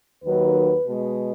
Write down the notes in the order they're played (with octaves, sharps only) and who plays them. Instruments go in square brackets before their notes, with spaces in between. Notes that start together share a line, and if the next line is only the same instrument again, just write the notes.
[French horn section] D#2 D#3 F#3 B4
B2 G#3